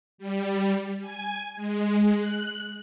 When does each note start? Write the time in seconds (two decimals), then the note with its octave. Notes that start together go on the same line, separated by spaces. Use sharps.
0.18 G3
1.01 G#5
1.56 G#3
2.17 F#6